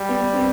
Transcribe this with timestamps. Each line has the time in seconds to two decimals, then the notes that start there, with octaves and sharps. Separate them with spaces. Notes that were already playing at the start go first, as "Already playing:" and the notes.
Already playing: G3
0.09 B3
0.21 B3
0.33 C4